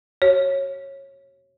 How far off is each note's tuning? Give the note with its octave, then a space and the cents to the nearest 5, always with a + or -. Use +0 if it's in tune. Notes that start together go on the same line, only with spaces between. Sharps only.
F#4 +35 C#5 -20